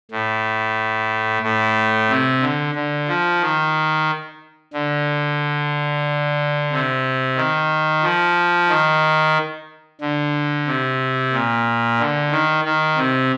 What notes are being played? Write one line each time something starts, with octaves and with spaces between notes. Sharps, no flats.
A2
A2
C3
D3
D3
F3
D#3
D3
C3
D#3
F3
D#3
D3
C3
A#2
D3
D#3
D#3
C3